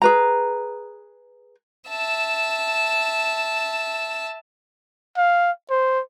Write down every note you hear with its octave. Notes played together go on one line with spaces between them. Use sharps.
G#4 B4 A#5
E5 A5
F5
C5